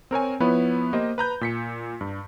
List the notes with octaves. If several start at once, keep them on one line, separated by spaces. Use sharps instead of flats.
C4 A#4 C#5 G#5
F3 B3 E4 B4 C#5
A#3 G4 C5 D#5
B4 A#5 G6
A#2 B6 C#7
G2